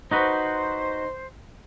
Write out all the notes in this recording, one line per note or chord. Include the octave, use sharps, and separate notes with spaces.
D#4 F#4 B4 C5